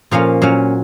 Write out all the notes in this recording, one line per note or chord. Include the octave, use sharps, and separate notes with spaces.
A#2 F3 A#3 C#4 F5
A#2 F#3 C#4 F5